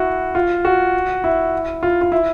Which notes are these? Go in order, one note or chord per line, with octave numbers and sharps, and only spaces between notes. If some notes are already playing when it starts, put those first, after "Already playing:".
Already playing: E4 F#4
F4
F#4
E4
F4
F4
E4